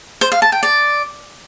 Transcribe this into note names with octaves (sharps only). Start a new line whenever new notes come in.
C5
F5
A5
G5
D5